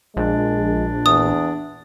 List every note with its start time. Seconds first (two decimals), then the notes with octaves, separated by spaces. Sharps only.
0.17 A#1 G#3 D4
1.06 E2 D#6